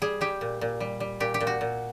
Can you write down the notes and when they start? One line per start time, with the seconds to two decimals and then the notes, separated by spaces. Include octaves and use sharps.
0.02 G3 G#4
0.21 G3 G4
0.41 A#2
0.61 A#2
0.80 G3
1.00 G3
1.20 A#2 G4
1.34 G4
1.41 A#2
1.47 F#4
1.61 A#2